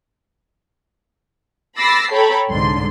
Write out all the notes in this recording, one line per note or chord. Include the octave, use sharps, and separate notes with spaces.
B5 D6 E6 A6 A#6 C7
A4 C#5 G5 A#5 B5
C2 G#2 D3 C6